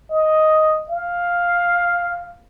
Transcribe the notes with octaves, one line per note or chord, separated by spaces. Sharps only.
D#5
F5